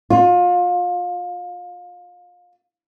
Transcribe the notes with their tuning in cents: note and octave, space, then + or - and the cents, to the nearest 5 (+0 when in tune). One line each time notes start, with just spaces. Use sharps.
F4 +30